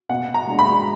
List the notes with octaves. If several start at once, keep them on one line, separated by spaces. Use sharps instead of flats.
B2 F#5
A#5
G#3 D4
B5